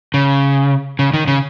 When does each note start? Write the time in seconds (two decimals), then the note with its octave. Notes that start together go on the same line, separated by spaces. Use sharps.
0.14 C#3
0.99 C#3
1.13 D#3
1.28 C#3